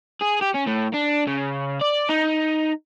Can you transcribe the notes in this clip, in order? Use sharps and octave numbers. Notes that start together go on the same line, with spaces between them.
G#4
G4
C#4
A2
D4
C#3
D5
D#4